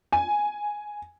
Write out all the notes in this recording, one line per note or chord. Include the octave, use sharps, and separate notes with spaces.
G#5